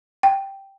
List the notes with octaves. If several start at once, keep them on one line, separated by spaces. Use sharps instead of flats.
G5